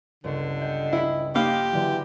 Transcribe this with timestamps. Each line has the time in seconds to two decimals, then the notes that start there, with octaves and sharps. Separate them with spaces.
0.24 G1 C#2 D3
0.62 D#5 G5
0.93 E4 B5
1.35 A#3 D#4 G4 F5 B5 C6 A#6
1.73 D3 E3 F#3